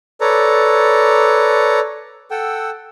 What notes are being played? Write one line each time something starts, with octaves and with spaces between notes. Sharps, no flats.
A4 B4 C#5 D5 A#5
A4 F#5 G5 E6